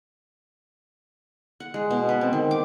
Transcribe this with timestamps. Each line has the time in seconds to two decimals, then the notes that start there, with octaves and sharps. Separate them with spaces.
1.60 F#5
1.74 G#3
1.90 B2
2.09 B4
2.21 C4
2.33 D#3
2.51 D6